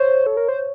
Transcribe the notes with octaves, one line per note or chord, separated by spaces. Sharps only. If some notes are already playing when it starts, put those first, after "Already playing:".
Already playing: C5 C#5
A4
A#4
C5